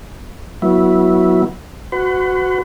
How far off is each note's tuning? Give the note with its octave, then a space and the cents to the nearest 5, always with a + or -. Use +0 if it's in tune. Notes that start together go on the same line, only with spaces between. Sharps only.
F#3 -5 B3 -25 E4 -5
F#4 +0 B4 +45